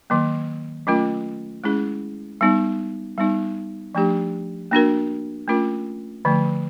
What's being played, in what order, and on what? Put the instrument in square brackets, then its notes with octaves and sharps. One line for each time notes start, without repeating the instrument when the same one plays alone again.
[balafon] D#3 F#3 A#3
F#3 A3 C#4 F4 A#4
G#3 C#4 E4 G#4
G3 B3 D#4
G3 B3 D#4
F3 A3 D4 G4
A#3 D4 F#4 A#4
A3 C#4 F4 A#4
D3 F3 A3